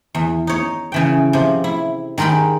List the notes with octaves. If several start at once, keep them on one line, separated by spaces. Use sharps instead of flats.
E2
D#4 C#5
C#3 E3 G5
C3 F3
E4
D#3 G#3 A#4 G5 B5